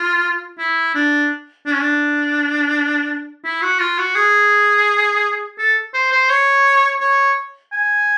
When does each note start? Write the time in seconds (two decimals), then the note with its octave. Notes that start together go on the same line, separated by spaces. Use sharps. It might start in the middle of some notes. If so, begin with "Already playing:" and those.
Already playing: F4
0.59 E4
0.95 D4
1.66 D4
1.74 C#4
1.82 D4
3.44 E4
3.62 F#4
3.80 F4
3.98 F#4
4.16 G#4
5.59 A4
5.94 C5
6.12 C5
6.30 C#5
7.01 C#5
7.72 G#5